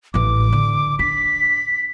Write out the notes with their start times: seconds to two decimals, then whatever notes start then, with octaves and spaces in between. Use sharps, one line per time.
0.14 A1 E3 D6
0.53 D3
0.99 D4 B6